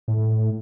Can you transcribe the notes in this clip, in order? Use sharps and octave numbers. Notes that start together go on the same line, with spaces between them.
A2